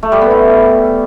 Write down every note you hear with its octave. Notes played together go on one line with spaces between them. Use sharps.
A3
G3
B3
E4